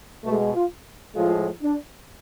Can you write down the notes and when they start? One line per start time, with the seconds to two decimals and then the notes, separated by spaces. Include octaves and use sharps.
0.24 B2 G#3 A3
0.54 F4
1.15 A2 F3 G#3 F4
1.61 D4